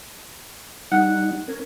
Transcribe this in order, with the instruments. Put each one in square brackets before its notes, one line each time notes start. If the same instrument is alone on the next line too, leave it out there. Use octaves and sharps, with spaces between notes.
[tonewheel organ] G3 D#4 [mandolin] F#5
[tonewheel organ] C#4 A#4 G#5